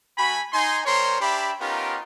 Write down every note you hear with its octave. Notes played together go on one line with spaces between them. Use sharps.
A3 F#4 G#5 B5
D#4 G#5 C6
G3 A#4 C5 C#5 C6
D4 G4 E5 B5
B3 C#4 D#4 F4 G4 A#4